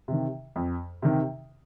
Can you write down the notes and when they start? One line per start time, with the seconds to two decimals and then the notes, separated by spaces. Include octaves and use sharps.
0.08 C3 D#3
0.56 F2
1.02 C3 D#3